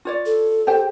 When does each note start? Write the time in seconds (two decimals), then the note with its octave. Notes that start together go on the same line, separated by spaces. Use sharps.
0.05 F4 C#5 D5
0.26 A4
0.67 G4 C5 G5